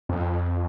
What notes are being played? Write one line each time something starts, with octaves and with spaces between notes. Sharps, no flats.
F2